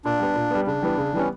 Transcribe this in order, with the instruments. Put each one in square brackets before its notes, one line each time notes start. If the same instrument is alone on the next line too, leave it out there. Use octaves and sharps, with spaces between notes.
[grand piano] A#2 [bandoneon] D4
[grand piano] G3 B3
A#2
G3 B3
[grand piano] C#3 [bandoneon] D4
[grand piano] E3 G3 B3
C#3
[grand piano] E3 G3 B3 [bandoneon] C#4